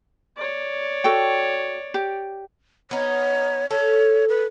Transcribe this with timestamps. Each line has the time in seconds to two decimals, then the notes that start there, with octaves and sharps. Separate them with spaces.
0.37 C#5 D5
1.04 F#4 A4 G5
1.94 G4
2.91 B3 D#4 C#5
3.71 A4 C#5
4.29 B4